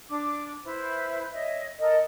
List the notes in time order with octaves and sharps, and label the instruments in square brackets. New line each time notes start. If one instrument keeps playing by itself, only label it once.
[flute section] D4 D6
E4 B4 C5
C#5 D#5 E5
[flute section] A4 A#4 [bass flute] D#5